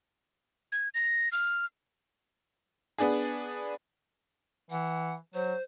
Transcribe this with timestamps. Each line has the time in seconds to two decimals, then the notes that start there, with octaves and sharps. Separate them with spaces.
0.72 G#6
0.95 A#6
1.32 F6
2.98 B3 D4 G#4
4.70 E3 F#5
5.34 F#3 C5